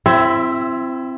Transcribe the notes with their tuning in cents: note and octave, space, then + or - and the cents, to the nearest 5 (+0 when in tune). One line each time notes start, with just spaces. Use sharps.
C4 +0 E4 +30 E5 +0